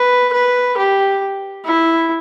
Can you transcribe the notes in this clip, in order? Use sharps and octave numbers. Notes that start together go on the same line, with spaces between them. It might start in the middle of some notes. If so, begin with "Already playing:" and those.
Already playing: B4
B4
G4
E4